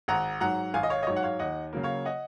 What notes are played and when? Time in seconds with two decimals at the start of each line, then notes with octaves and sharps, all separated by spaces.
0.08 G#1 F#5 A#5
0.40 G#2 F#3 F#5 A#5
0.74 G#1 F5 G#5
0.83 D#5
0.90 C#5 F5
1.03 D#5
1.07 G#2 F#3 C#5
1.16 F#5
1.23 C#5 F5
1.39 D#2 D#5 F#5
1.73 C#3 F#3 A#3
1.83 C#5 F5
2.05 D#5 F#5